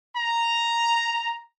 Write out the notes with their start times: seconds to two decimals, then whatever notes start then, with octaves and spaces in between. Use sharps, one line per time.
0.17 A#5